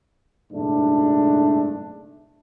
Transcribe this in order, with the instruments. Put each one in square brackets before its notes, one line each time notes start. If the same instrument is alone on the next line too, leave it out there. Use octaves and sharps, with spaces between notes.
[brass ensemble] F#1 B1 G#2 A3 D4